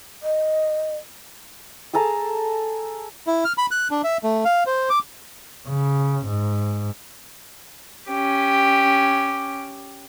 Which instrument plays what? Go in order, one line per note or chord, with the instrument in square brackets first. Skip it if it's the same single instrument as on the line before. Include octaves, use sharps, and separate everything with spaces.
[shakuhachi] D#5
[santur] G#4 A4 A5 A#5
[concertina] E4
F6
B5
F#6
D4
E5
A3
F5
C5
D6
[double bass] C#3
G#2
[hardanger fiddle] C#4 G4